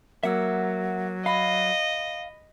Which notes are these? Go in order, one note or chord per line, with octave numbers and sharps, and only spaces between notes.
F#3 A#3 E5 F#5 E6
D#5 F5 B5